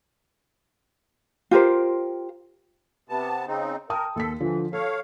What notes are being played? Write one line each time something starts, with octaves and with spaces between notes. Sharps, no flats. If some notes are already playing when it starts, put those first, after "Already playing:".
F4 G4 A#4 C5
C3 B3 A5
C#3 C4 D#4
A#4 G5 A5 D#6
D#2 A4 B6
D3 E3 F3
A4 C#5 F5